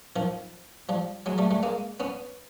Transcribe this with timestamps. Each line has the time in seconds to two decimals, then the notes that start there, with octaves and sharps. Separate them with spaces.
0.16 D#3 F3
0.89 F3 G3
1.26 F#3 G#3
1.38 G3 A3
1.51 G3 A3
1.63 G#3 A#3
2.00 B3 C#4